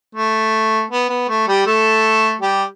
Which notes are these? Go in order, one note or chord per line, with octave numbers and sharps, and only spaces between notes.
A3
B3
B3
A3
G3 G4
A3 A4
G3 G4